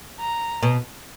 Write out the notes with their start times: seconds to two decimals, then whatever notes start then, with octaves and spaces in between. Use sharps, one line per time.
0.19 A#5
0.63 B2